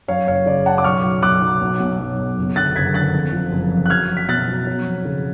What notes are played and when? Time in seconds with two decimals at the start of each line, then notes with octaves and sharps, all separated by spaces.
0.08 F#2 C#5 F5
0.28 F#1 C#5 F5
0.46 C#3 D5
0.66 F#2 F#5 A5
0.78 D6
0.84 B1 C#6 F6
1.03 F#3
1.23 B1 D6 F#6
1.41 F#3
1.61 B1
1.80 B2
1.99 B1
2.19 B1
2.38 F#1
2.56 D3 F#6 A6
2.76 F#1 G#6 B6
2.94 D3 F#6 A6
3.14 F2
3.32 F3
3.52 F#1
3.71 F2
3.86 F#6
3.90 F#3 F6 G#6
4.09 F#3
4.17 B6
4.28 B2 F#6 A6
4.48 F#3
4.67 F#3
4.86 F2
5.05 C#3